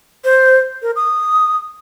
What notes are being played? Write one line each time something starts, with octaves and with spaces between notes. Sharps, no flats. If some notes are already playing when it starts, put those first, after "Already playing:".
C5
A#4
D#6